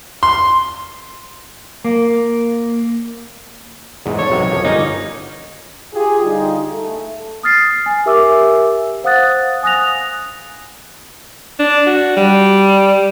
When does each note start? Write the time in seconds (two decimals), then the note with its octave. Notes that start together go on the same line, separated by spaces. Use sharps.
0.23 C6
1.85 A#3
4.06 E2 G#2
4.18 A4 C#5
4.30 B1 C3 F#3
4.51 F#2 F3
4.64 G1 A#3 C#4 D#4
5.94 F4 G4 G#4
6.24 D3 G3 D#4 F4
6.71 A3
7.43 D#6 F6 A6 C7
7.86 G#5
8.06 G4 A#4 E5 G#5 D6 E6
9.04 C5 F5 F#5 D#6 F#6 A6
9.63 G#5 D#6 F#6 A#6 F7
11.59 D4
11.86 F#4
12.17 G3